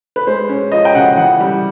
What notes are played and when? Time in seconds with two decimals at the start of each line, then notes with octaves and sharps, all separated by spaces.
0.16 B4
0.27 G#3 C5
0.49 C#4
0.72 F3 D#5
0.85 G5
0.95 C#3 F#5
1.17 E3 F#5
1.40 G3